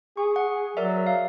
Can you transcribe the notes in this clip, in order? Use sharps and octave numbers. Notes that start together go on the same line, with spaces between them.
G#4 C#6
F#5
F#3 A#4 D5 E5
F5